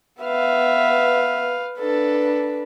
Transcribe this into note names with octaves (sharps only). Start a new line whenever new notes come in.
B3 B4 E5 F5
D4 A4 B4